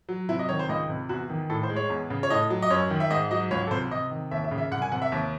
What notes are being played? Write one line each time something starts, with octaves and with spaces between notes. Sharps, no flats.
F#3
C3 E4
D#5
D#3 C#5
C5
C#2 D#5
C3
E2 F#4
D#3
A2 A4
C5
G#3
C#5
E2
C#3
C#5
A2 D#5
F#3
D#5
F#2 C#5
D#3
E5
G#2 D#5
F#3 D#5
C#2 C#5
A4
C3 C5
C3 D#5
D#3
D#2 E5
E5
C#3
E5
C2 F#5
G#5
C3 F#5
E5
D#2